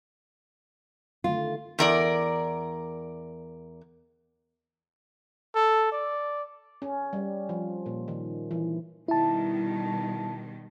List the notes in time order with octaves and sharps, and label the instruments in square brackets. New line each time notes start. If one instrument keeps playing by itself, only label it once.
[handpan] D3 D#3 A3 [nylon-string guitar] F4
[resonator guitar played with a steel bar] E2 A#4 D5
[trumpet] A4
D5
[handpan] C#4
G3
F3
A#2
D#3
E3
[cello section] B2 D#3 G3 [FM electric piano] E4 A5